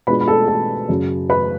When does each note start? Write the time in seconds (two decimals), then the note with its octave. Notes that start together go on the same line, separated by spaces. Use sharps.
0.07 B2 G#3 D4 F4 B4 B5
0.21 B5
0.28 A4 A5
0.48 A4 A5
0.89 F#2 C#3 F#3
1.30 B4 B5